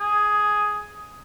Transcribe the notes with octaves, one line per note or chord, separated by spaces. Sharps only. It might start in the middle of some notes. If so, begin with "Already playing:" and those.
G#4